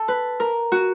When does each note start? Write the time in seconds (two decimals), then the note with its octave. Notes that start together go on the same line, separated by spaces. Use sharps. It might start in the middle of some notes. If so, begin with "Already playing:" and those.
Already playing: A4
0.08 B4
0.40 A#4
0.72 F#4